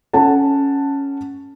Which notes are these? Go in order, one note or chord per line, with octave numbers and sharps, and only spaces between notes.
C#4 A4 F#5 A5